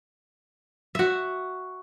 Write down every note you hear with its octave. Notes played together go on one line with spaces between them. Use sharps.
F#4 E5